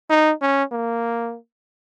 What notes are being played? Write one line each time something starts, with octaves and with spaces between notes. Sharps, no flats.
D#4
C#4
A#3